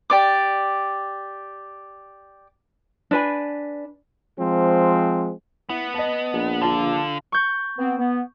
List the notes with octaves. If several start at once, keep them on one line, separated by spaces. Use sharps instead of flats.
G4 D5 D6
D4 B4 G#5
F3 G#3 C4
B3 E4
D#5 A5
A#1
D3 F4 F5 A5
C#6 G6
B3 C4
B3